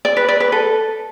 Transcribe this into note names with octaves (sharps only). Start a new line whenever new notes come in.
D5
B4
D5
B4
A4